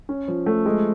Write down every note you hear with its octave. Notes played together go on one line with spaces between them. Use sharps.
C#4
F3
A3
G#3